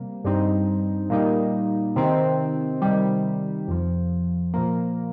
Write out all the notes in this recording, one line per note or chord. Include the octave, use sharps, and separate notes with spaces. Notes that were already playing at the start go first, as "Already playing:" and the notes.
Already playing: C3 G3 A#3
G2 G3 C4 D#4
A#2 G3 A#3 D#4
C3 D#3 C4
C3 D#3 G3
F2 C3 F3
A#2 F3 A#3